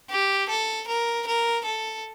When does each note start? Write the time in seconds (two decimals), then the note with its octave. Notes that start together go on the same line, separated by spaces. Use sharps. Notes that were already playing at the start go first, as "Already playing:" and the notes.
0.10 G4
0.49 A4
0.88 A#4
1.27 A#4
1.65 A4